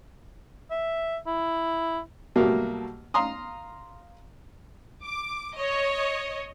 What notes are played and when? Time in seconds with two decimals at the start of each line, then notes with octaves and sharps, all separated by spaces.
0.71 E5
1.27 E4
2.36 B2 F#3 G3 A3 A#3
3.14 F5 A#5 C6 D#6
5.02 D6
5.57 C#5 D#5